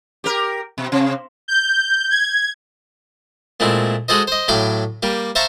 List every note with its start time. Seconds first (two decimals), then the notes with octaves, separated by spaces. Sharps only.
0.24 G4 A#4
0.78 B2
0.92 C3
1.48 G6
2.10 G#6
3.60 A#2 G#3 A3 C4 E4
4.08 G#3 F#4 G#4 A4 C5 D#5
4.27 C5 D#5
4.48 A2 F#3 F5 G5 B5 D6
5.03 G3 A#3 G4
5.35 C5 E5 F5 A5 A#5 C#6